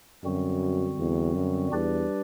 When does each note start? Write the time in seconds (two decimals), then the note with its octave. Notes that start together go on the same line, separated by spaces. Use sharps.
0.24 F#2 D3 G3 C4 F#4
0.99 E2
1.35 F#2
1.71 E2 G3 D4 G4 B4 D5